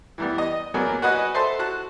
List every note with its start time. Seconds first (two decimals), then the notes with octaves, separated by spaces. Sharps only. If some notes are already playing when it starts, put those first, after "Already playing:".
0.18 E3 G3 B3
0.38 D#5
0.74 F#3 A#3 B3 G#4 D5
1.02 F#4 B4 D#5 F#5 G#5
1.34 A4 C5 E5 A5 C6
1.59 F#4 A5 F#6